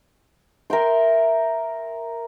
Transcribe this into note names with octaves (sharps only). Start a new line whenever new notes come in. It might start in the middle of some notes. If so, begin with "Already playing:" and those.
A#4 E5 G5 C6